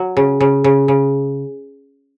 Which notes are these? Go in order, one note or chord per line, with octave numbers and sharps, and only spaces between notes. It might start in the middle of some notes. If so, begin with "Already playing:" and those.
Already playing: F#3
C#3
C#3
C#3
C#3